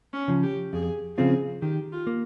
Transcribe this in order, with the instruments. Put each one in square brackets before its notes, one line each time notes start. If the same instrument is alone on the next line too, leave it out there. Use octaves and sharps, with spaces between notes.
[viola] C#4
[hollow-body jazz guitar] C#3 F3
[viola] G4
[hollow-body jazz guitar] F2 [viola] G#4
[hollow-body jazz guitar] C#3 F3 C4 F4 [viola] G#4
[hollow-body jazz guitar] D#3 [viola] G4
[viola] F4
[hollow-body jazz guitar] A#3